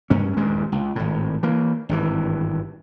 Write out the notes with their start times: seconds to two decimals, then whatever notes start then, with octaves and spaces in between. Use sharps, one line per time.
0.10 G2 C#4
0.37 D#1 E2 G2 G#3
0.72 C#2
0.96 G#1 A2
1.43 E3 A#3
1.89 G#1 G2 E3